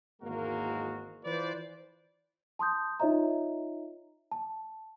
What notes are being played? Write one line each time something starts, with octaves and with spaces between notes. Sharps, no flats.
G#1 E2 G#3 A#3 F#4 A#4
E3 F4 B4 C5 D5
A5 C6 D#6 G6
D#4 F4 C#5 D#5 E5 A#5
A5